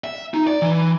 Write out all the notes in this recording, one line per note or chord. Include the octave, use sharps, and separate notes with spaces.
E5
D#4
D5
E3